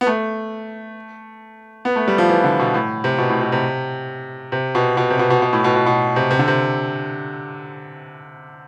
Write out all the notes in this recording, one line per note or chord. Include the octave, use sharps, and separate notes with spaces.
B3
A3
B3
A3
G3
F3
E3
D3
B2
A2
C3
B2
A2
B2
C3
C3
B2
B2
C3
B2
B2
B2
A2
B2
B2
B2
C3
C3
D3
C3